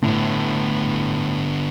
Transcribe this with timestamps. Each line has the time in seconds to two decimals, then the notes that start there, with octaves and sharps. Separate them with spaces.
0.03 A2 D3 B3